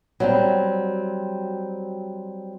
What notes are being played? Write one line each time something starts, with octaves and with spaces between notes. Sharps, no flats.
F#3 G3 C4